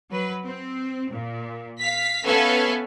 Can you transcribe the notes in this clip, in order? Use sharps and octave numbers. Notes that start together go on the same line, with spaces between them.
F#3 B4
C4
A#2
F5 B6
B3 C#4 A4 B4 E5 F5